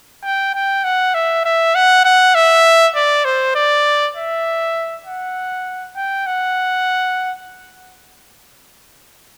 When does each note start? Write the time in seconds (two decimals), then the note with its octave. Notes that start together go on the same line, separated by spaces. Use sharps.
0.24 G5
0.54 G5
0.84 F#5
1.14 E5
1.45 E5
1.75 F#5
2.05 F#5
2.35 E5
2.95 D5
3.25 C5
3.55 D5
4.16 E5
5.06 F#5
5.96 G5
6.27 F#5